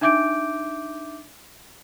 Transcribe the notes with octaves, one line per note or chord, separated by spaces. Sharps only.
D4 D#4 E5 D6 G6 D7